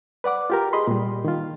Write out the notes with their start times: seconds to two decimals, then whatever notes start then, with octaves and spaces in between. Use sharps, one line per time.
0.24 B4 D5 F#5 D6
0.50 F4 G4 A#4
0.73 G#4 D#5 B5 C6
0.87 A#2 G3
1.25 D#3 F4